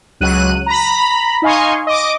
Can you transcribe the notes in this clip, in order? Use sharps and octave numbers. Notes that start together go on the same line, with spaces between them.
C#2 F#3 F#6 D#7
A#5 B5
D#4 D#5 F5 G#5 C6 C#6
D#5 D6